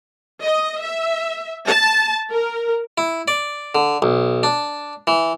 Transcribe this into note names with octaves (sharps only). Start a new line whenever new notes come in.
D#5
E5
A5
A#4
E4
D5
D3
B1
D4
E3